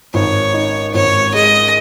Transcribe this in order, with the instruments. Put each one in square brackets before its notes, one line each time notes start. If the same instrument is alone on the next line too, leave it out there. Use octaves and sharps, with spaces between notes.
[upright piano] G#1 [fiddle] C#5
[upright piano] D#4
[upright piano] G#1 [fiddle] C#5
[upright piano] G#3 [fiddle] D#5